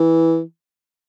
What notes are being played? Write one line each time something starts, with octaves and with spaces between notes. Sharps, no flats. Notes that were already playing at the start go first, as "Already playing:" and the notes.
Already playing: E3